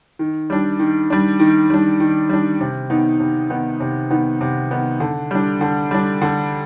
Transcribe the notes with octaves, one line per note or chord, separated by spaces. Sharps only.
D#3
G3 D4
D#3
G3 D4
D#3
G3 D4
D#3
G3 D4
C3
D#3 B3 D#4
C3
D#3 B3 D#4
C3
D#3 B3 D#4
C3
D#3 B3 D#4
D3
G3 D4
D3
G3 D4
D3